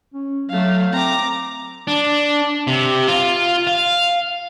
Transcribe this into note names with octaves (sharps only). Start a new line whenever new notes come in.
C#4
F#3 A3 F5
C4 A#5 D6
D4
C3
F4
F5